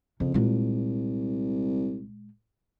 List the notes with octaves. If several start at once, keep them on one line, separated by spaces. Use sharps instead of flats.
F2 C#3
C2 A#2 G#3